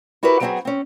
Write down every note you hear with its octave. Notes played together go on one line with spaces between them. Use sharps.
E4 F#4 G4 A#4 B4
F#3 G3 B3 C4 F#4 G#4
C4 C#4